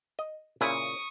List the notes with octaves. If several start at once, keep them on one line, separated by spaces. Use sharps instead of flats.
D#5
A#2 C#3 E4 C#6 D#6